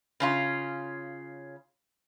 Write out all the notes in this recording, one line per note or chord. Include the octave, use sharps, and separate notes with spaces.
C#3 C#4 F4